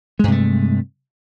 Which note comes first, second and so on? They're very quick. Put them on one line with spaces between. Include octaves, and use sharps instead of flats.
G#3 G2 C3 A3